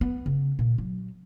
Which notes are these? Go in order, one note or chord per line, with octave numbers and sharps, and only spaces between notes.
B3
C#3
A#2
F#3